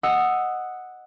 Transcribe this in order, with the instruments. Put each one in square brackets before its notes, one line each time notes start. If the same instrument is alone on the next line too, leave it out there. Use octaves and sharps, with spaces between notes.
[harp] D#5 F#5 D#6 E6